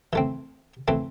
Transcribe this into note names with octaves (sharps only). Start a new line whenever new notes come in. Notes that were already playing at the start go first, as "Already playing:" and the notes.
E3 A3 C4
E3 A3 C4